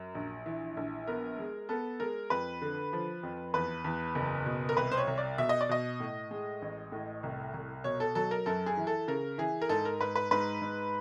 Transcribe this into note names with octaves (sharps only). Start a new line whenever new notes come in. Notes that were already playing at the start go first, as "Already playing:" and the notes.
Already playing: F#2
A#1
E3
A#1
B3 A#4
G#3
B3 A4
G#3 A#4
F2 B4
D3
F3
F2
E2 B4
E2
F#1
B2
A#4
C2 B4
C5
C#5
C2
D5
B2 E5
D#5
D5
B2 D#5
A2
G#3
A1
A2
C2
C2
B2 C#5
A4
F#3 A4
A#4
F#2 A4
G#4
E3
A4
C#3 A#4
E3 G#4
A#4
G#2 A4
A#4
G#2 B4
B4
G#2 B4
G#2